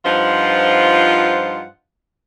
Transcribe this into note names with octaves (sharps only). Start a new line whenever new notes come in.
G2 F3 D#4 F4 C5 F#5